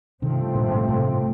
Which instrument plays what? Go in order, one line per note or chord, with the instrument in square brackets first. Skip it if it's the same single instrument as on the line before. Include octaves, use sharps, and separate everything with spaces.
[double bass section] G2 F3 A3 C4 [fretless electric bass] C3 D#3
[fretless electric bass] A#2 D3
A2 C3
A2 C3